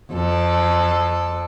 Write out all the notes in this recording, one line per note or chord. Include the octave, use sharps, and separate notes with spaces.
F2 A4